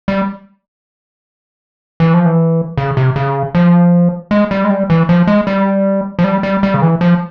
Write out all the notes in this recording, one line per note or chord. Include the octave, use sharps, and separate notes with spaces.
G3
E3
F3
E3
C#3
C3
C#3
F3
G#3
G3
G#3
G3
E3
F3
G#3
G3
F3
G3
G3
G3
C#3
E3
F3